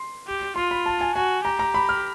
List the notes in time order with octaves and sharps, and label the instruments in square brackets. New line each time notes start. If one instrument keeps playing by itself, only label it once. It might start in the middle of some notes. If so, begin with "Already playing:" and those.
Already playing: [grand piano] C6
[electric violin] G4
[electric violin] F4 [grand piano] C6
[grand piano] B5
A5
G#5
[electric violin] F#4 [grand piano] G#5
[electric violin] G4 [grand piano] A#5
[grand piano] A#5
B5
F6